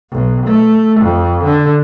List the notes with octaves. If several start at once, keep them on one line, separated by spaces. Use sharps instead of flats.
B1
A3
F2
D3